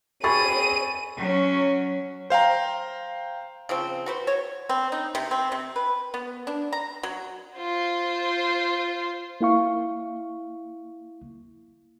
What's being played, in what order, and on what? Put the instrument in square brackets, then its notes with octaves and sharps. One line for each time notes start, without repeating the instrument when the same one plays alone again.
[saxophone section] C4 G#4 [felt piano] B5 C#6 A6 [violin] D#7
[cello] F#3 C#4
[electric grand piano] C5 F5 G5 A#5
[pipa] C#3 F3 C4
F#4 B4 C5
C#5
C4
D#4
C3
C4
C3
B4
B3
D4
A#5
F#3
[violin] F4 C5
[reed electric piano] A#3 E4 F5 C#6